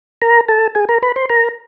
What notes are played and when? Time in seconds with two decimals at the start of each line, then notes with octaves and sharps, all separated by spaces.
0.22 A#4 A#5
0.48 A4 A5
0.75 G#4 G#5
0.89 A#4 A#5
1.02 B4 B5
1.16 C5 C6
1.29 A#4 A#5